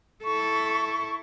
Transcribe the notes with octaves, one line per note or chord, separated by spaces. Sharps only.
E4 A4 C#6